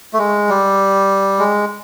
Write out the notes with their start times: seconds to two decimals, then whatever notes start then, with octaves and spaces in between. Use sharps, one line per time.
0.13 A3
0.18 G#3
0.49 G3
1.39 G#3